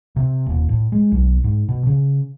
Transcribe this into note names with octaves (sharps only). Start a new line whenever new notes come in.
C3
D#1
A2
G#3
B1
G#2
B2
C#3